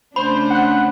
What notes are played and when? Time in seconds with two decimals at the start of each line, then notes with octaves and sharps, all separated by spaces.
0.16 C#3 A3 D4 C5 B5
0.50 F#5 F#6